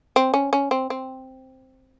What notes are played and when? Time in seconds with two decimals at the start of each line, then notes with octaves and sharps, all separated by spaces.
0.16 C4
0.34 C#4
0.53 C#4
0.71 C4
0.90 C4